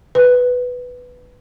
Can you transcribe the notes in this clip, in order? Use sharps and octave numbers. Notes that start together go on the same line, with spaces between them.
B4